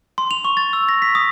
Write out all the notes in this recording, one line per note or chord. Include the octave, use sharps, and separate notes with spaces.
C6
F7
C#6
A6
E6
A#6
B6
D#6